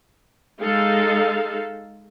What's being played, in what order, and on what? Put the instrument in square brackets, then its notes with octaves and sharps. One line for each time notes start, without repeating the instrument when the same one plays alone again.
[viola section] G#3 D#4 A4 F5